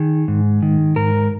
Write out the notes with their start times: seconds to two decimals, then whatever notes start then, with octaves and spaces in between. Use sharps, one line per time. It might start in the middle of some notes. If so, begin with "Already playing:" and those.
Already playing: D#3 G#4
0.28 G#2
0.62 D#3
0.96 G#2 A#4